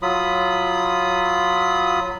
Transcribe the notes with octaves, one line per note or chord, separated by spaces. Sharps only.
F#3 F4 B5 D#6